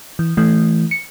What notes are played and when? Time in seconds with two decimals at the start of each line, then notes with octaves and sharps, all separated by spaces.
0.19 E3
0.37 E3 A3
0.91 C#7